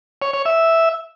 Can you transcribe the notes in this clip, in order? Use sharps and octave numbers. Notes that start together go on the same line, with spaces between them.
C#5
C#5
E5